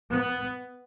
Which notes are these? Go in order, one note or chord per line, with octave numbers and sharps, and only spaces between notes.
B3